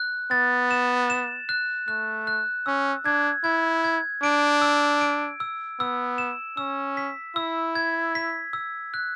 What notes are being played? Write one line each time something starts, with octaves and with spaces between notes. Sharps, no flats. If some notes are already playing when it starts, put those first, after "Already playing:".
Already playing: F#6
B3 A6
E7
E7
F#6
A3 F#6
F#6
C#4 E6
D4 G#6
E4 G#6
G#6
D4 D7
E6
D7
E6
B3 E6
E7
C#4 E6
B6
E4 E6
G#6
B6
E6
F#6